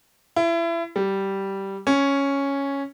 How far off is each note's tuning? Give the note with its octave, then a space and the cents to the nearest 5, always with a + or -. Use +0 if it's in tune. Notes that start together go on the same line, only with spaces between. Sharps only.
E4 +30
G3 -10
C#4 +0